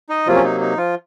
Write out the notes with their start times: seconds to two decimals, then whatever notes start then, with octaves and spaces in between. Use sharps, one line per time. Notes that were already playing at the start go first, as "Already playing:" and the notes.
0.09 D#4 D#5
0.26 C3 F3 F#3 A#3 F4
0.35 C#4
0.44 D#4
0.61 D#4
0.77 F3 F4